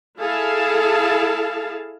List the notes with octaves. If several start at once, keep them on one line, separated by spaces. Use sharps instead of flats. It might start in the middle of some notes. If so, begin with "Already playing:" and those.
E4 G#4 A4 F5 A5